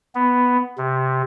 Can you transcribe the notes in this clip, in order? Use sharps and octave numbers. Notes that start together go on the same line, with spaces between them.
B3
C3